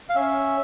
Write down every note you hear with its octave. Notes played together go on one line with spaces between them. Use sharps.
F5
C#4 E5